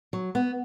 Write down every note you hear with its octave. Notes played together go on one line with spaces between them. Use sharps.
F#3
B3